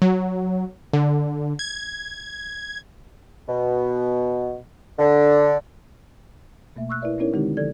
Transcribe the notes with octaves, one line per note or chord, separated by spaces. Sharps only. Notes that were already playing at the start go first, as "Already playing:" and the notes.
F#3
D3
G#6
B2
D3
B2 A3 A#3 E5
C#6 E6 F#6
E4 A#4 B4 D5 E5
B3 C#4 D#4 E4 A#4 C#5
D3 D#3 G#3 C4 D#4 G4
D3 F3 A4 D5 G#6